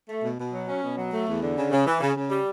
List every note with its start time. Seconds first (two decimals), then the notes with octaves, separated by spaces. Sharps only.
0.09 A3
0.23 B2
0.38 B2
0.53 F#3
0.68 C#4
0.82 B2
0.98 F#3
1.12 A3
1.27 E2
1.42 D3
1.56 C#3
1.71 C#3
1.86 E3
2.01 C#3
2.16 C#3
2.30 G3